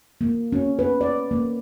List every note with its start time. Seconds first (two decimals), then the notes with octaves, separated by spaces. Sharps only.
0.21 A#3
0.53 C#4
0.79 B4
1.01 D5
1.31 A#3